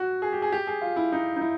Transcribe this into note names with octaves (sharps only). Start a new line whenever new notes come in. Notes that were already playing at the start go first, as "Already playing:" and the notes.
Already playing: F#4
G#4
G4
G#4
G4
G#4
F4
E4
D#4
D#4
E4